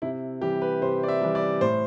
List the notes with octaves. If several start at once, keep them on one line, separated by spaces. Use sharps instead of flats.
C3 E4
E3 G3 G4
B4
C3 C5
D5
E5
E3 G3
D5
A2 C5